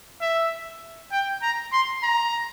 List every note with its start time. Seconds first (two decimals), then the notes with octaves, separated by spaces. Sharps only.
0.21 E5
1.12 G5
1.42 A#5
1.73 C6
2.03 A#5